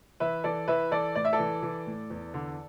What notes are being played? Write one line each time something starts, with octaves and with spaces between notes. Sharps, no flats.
E3 B4 E5
E3 A4 D5
E3 B4 E5
E3 A4 D5
A2 D5
E5
A4 D5
E3
E3
A2
E2
D3